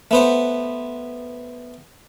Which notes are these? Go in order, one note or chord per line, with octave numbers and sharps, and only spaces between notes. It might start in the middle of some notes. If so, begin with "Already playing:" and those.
A3 B3 C5